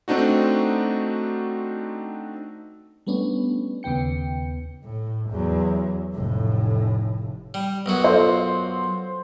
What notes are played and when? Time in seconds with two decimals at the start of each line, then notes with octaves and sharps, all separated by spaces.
0.08 A3 C4 D4 D#4 F#4
3.07 G3 A3 B3 C#4 D4
3.83 D#2 C#3 B3 G5 C#7
4.84 A2
5.30 E2 F#3
6.13 F1 A2
7.54 G3
7.86 B1 F#2 F#4
8.04 F4 A4 C5